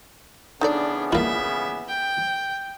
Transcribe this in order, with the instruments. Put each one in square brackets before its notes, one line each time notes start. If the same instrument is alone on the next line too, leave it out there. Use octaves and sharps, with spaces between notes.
[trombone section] C#3 E3 B3 [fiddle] D4 [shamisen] D#4 A4 D5
[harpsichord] A#3 E4 [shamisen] F4 [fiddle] E5
[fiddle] G5